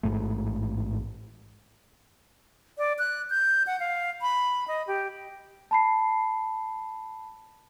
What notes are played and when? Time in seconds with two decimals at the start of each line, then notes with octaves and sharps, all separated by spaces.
0.03 A1 G#2 A3
2.78 D5
2.99 F#6
3.30 G6
3.67 F#5
3.80 F5
4.22 B5
4.68 D#5
4.87 G4
5.71 A5 B5 C7